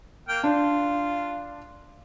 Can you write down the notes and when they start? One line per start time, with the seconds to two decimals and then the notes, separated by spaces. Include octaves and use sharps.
0.28 A#3 G5 F6
0.43 D4 F4